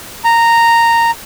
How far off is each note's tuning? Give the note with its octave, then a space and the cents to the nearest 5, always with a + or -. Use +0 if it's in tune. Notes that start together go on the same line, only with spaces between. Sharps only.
A#5 -10